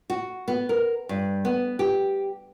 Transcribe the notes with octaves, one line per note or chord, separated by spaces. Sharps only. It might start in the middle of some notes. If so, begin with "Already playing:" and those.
F#4
B3
A#4
G2
B3
G4